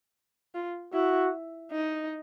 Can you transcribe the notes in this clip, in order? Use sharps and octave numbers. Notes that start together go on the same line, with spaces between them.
F4
E4 F#4
D#4